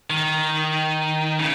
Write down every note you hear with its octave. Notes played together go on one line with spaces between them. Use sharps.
D#3
C#3